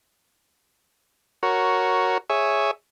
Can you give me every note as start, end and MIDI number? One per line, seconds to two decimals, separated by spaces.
1.43 2.18 66
1.43 2.18 70
1.43 2.18 73
2.30 2.71 68
2.30 2.71 73
2.30 2.71 76